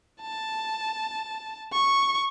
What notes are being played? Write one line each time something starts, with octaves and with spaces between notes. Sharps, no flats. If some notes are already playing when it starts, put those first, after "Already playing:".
A5
C#6